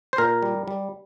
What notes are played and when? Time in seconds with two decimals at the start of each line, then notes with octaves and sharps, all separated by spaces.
0.13 C5
0.18 A#2 A#4
0.42 G3
0.68 G3